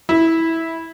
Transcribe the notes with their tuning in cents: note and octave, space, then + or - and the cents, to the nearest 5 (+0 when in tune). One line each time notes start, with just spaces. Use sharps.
E4 -15